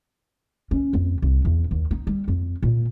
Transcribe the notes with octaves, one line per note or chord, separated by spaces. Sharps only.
C#4
F2
C2
E2
D#2
D#4
G3
F2
A#2